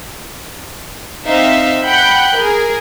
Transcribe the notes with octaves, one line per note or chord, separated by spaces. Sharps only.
C4 D#4 E5 F5
F#5 G5 B5 F#6 G6
G#4 A#4